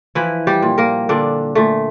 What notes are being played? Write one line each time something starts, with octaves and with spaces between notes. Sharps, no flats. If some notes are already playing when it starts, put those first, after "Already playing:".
E3 F3 E4
G3 G4
A#2
A#3 A#4
A#2 D3 D4
A#2 A3